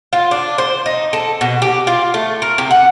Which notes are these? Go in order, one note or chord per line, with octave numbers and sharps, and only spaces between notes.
F4
D4
C5
D#4
A4
B2
G4
F4
A3
A#4
C3
F#5